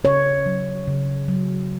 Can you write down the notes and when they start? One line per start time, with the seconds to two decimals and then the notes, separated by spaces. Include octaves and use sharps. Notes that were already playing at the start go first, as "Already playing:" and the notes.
0.04 C#3 C#5
0.46 F#3
0.87 C#3
1.28 F#3